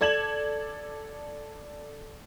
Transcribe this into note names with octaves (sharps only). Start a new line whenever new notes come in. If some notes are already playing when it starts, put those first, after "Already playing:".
A4 D5 G#6 E7 F#7